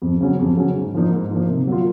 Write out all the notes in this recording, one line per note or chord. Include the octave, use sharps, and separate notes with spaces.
F2
C#3 F#3 C#4
F2
C#3 F#3 C#4
G#2
F3 A#3 D#4
G#2
F3 A#3 D#4
C3
F#3 A#3 F4